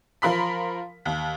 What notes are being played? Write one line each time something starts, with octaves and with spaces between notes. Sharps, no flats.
F3 A#4 F5 B5 C6 B6
D#2